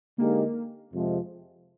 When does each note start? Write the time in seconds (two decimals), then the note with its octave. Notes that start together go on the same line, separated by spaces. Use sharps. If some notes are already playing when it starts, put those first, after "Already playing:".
0.18 D3 G#3 A#3 D#4 G4 A#4
0.92 F2 C3 F3 G#3